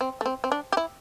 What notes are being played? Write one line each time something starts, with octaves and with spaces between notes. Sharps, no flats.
C4
A3
C4
C4
D4
G4
E4